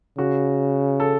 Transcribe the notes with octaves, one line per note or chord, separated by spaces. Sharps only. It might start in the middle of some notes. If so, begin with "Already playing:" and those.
C#3 F#4
A4